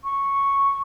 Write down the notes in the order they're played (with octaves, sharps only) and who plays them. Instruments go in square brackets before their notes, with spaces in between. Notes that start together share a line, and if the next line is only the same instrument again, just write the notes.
[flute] C#6